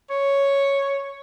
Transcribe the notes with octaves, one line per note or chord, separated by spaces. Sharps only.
C#5